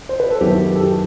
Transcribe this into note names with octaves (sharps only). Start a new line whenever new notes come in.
C5
B4
A4
F#2 D#3 F#3 B3 E4 G4
G4
A4
G4